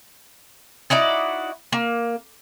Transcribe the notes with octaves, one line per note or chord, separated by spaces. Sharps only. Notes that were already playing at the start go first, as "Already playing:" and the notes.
D#4 E4 F#4 D5
A#3